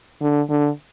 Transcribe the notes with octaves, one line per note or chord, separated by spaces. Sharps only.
D3
D3